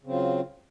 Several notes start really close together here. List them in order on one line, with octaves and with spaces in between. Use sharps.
C#3 C4 F#3 F4